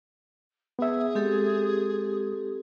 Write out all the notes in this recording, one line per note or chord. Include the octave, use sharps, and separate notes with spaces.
B3 G#4 E5
G#3 C4 G4 A4